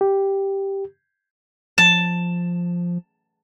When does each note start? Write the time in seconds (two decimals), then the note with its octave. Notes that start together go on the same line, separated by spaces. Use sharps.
0.01 G4
1.78 F3 A5